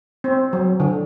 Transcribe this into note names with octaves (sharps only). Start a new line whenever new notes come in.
C4
F#3
D3